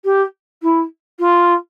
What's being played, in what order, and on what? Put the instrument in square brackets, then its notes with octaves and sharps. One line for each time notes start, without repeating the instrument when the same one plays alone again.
[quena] G4
E4
F4